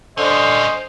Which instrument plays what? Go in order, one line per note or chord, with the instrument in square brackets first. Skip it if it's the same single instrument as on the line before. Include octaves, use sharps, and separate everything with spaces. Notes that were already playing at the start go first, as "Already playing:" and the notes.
[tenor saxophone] D3 [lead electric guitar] G3 C#4 [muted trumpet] C5 [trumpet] D#5